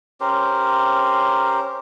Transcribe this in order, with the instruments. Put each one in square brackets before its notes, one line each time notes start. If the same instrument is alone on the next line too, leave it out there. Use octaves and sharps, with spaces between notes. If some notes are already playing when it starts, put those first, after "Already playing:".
[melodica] C#4 G4 A#4 C5